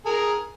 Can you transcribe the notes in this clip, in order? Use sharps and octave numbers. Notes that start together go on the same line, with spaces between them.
G#4 A#4